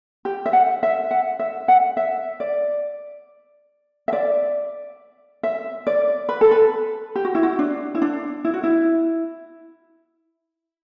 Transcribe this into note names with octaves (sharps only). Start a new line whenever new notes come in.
G4
E5
F#5
E5
F#5
E5
F#5
E5
D5
E5
D5
E5
D5
B4
A4
B4
G4
F#4
E4
F#4
D4
E4
D4
E4
F#4
E4